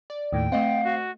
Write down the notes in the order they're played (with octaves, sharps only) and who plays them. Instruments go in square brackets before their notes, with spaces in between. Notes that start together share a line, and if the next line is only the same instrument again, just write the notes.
[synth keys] D5
[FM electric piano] D#2 A2 [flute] G5
[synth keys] A3 D#5 F#5 [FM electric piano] C4 [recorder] F5
[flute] F#4